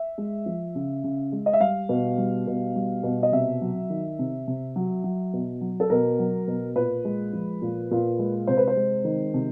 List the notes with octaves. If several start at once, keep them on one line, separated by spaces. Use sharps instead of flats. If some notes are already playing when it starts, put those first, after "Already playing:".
Already playing: E5
G#3
F3
C#3
C#3
G#3
D#5
E5
G3 F5
B2
G3
B2
G3
B2
D#5
C3 E5
F#3
D#3
C3
C3
F#3
F#3
B2
F#3
A4
B2 A#4
F#3
B2
A#2 B4
G#3
F3
A#2
A#2
G#3
C3 C5
B4
C5
G#3
D#3
C3